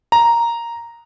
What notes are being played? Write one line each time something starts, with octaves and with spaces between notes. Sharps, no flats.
A#5